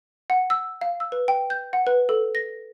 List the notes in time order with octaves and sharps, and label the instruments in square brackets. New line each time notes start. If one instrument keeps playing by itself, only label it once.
[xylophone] F#5
E6
F5
E6
B4
G5
G6
F#5
B4
A4
A#6